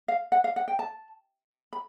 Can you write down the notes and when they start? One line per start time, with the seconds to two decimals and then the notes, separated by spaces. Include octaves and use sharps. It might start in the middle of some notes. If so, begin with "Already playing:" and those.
0.08 F5
0.32 F#5
0.44 F5
0.56 F#5
0.68 G5
0.79 A5
1.73 B5